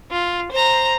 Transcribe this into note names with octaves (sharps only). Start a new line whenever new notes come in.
F4
C5 A#5